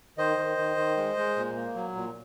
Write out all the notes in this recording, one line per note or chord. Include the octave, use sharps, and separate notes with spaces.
D#3 C5 D#5
D#3
D#3
D#3
G#3
G#3
A#2
A#3
F#3
A#2